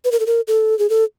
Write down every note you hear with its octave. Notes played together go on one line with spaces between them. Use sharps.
B4
A#4
A4
A#4
A4
G#4
A4